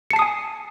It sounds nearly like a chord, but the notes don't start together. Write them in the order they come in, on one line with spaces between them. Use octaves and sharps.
C#7 A5 C7 D#6 G#5